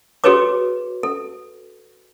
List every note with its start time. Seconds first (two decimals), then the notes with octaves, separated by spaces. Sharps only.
0.24 F#4 G#4 A4 B4 C#5 D6
1.03 A4